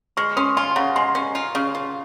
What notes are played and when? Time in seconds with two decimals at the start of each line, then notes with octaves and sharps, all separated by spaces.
0.17 G#3 C#6 F6
0.37 C#4 C6 D#6
0.57 F4 G#5 C6
0.71 G#5
0.76 C#3 F#5 A#5
0.96 G#3 G#5 C6
1.15 C#4
1.35 F4
1.55 C#3
1.75 F4